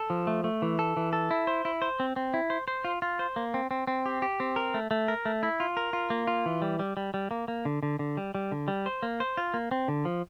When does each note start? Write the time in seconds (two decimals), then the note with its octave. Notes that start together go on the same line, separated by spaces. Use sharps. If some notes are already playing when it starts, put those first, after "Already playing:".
Already playing: A4
0.10 F3
0.27 A3
0.44 A3
0.62 E3
0.79 A4
0.97 E3
1.13 A4
1.31 E4
1.47 C5
1.65 E4
1.82 C5
2.00 C4
2.16 C4
2.34 E4
2.50 C5
2.68 C5
2.85 F4
3.02 F4
3.19 C5
3.36 A#3
3.54 C4
3.71 C4
3.87 C4
4.06 G4
4.22 G4
4.40 C4
4.56 A#4
4.74 A3
4.91 A3
5.08 A#4
5.25 A3
5.43 E4
5.60 F4
5.77 A#4
5.93 F4
6.10 A#3
6.27 F4
6.46 E3
6.62 G3
6.79 G3
6.97 G3
7.14 G3
7.31 A#3
7.48 A#3
7.65 D3
7.83 D3
7.99 D3
8.17 G3
8.35 G3
8.52 D3
8.68 G3
8.86 C5
9.03 A#3
9.20 C5
9.37 F4
9.54 A#3
9.71 C4
9.88 D3
10.05 F3